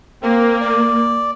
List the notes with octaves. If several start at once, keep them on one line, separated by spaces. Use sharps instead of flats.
A#3 C4
D5